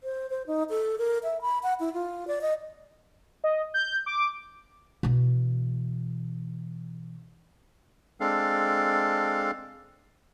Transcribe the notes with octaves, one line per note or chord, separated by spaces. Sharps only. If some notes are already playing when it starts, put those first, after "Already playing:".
C5
C5
D#4
A4
A#4
E5
B5
F#5
E4
F4
D5
D#5
D#5
G6
D6
B2 E3
G#3 C4 D4 A4 F5